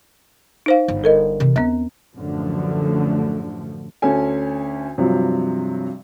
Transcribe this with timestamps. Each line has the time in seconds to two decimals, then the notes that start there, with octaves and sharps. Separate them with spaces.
0.66 D#4 C5 F5
0.88 G1
1.04 A4 A#4 D#5
1.40 C3 E3
1.56 D#2 B3 C4
2.15 A1 F#2 D3 F3 A3
4.02 D2 C#4 A4 G#5
4.98 G2 C3 F3 F#3